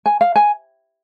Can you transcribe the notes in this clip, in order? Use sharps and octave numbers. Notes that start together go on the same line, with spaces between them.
G#5
F5
G#5